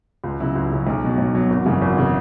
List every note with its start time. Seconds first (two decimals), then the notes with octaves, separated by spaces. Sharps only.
0.24 C#2
0.40 C#3 F#3 C#4 E4
0.56 C#2
0.71 C#3 F#3 C#4 E4
0.87 B1
1.03 B2 F#3
1.18 B1
1.35 B2 F#3
1.50 G#1
1.66 F#2 C#3 E3
1.82 G#1
1.97 C#3 E3